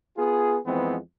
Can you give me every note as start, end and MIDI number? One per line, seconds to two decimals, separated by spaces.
0.17 0.57 59
0.17 0.57 65
0.17 0.57 68
0.66 0.97 41
0.66 0.97 52
0.66 0.97 56
0.66 0.97 59
0.66 0.97 60